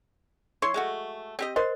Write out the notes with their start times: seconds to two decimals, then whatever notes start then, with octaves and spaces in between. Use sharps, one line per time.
0.62 E4 C#5 C6 C#6
0.74 G#3 A3 F#4
1.39 C4 G4 D#5
1.56 A#4 C5 D#5 C6